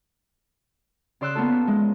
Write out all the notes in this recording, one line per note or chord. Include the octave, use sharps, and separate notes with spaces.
C#3 D5 C6 E6 F#6
A#3 B3 C#4 F4 A4
G#3